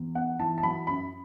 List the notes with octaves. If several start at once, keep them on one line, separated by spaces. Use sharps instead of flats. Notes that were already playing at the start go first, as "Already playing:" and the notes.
Already playing: E2
B3 F#5
E3 A5
A5
F#3 B5
F#2 B5